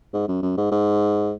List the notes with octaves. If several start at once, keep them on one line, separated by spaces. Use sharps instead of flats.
G#2
F#2
F#2
G#2
G#2